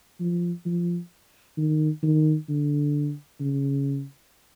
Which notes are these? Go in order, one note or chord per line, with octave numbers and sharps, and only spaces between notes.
F3
F3
D#3
D#3
D3
C#3